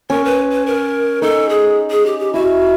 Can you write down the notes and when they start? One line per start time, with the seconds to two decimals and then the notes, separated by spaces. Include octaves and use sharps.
0.10 C#4 A#4
0.25 B4
0.52 B4
0.66 A#4
1.22 D#4 A4
1.49 G#4
1.91 G#4
2.06 G4
2.19 G4
2.34 E4 F#4